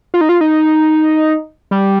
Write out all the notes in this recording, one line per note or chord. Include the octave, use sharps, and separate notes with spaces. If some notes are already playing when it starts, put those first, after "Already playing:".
F4
D#4
F4
D#4
G3